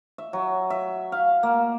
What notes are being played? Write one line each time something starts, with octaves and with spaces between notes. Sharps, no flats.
E5
F#3
E5
F5
A#3